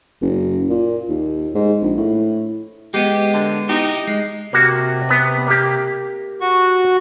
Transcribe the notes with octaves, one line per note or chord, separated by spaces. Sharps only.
F#1
A#2
D#2
G#2
A#1
A2
G#3 B3 G4
D3
D#4 E4 G4
G#3
C3 A#3 F#4
B3 B4
A#3 G4
F#4 C#6